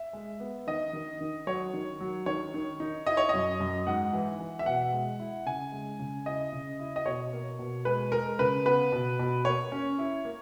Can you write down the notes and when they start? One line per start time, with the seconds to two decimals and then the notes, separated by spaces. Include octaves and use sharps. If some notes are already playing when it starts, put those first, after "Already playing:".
Already playing: E5
0.13 G#3
0.40 B3
0.67 D#3 D#5
0.93 D#3
1.21 D#3
1.47 F#3 C#5
1.74 D#3
2.00 F#3
2.26 D#3 C#5
2.54 D#3
2.80 D#4
3.06 E4 D#5
3.17 C#5
3.29 F#2 D#5
3.60 F#2
3.87 G#2 F#5
4.13 E3
4.39 E3
4.59 E5
4.66 B2 F#5
4.93 G#3
5.20 E4
5.46 C#3 G#5
5.72 G#3
5.99 C#3
6.26 E4 D#5
6.53 C#3
6.80 E4
6.96 D#5
7.05 B2 C#5
7.33 A#3
7.59 B2
7.85 G#3 B4
8.12 G#3 A#4
8.39 C#3 B4
8.65 B3 B4
8.92 B2
9.19 B2
9.45 A#3 C#5
9.72 C#4
9.98 E4
10.25 A#3